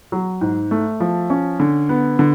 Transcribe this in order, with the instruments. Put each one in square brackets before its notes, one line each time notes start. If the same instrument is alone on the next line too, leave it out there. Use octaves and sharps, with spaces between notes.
[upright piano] F#3
G#2
A3
F3
C#4
D3
B3
D3